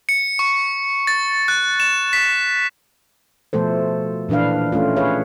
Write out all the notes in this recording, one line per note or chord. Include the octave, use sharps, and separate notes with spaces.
C#7
C#6
A6
F#6
E7
B6
B2 F3 A3 A4 C5
A#2 E3 D4 B4 F5
A3 C#4 F4
G#4 B4 C#5 F5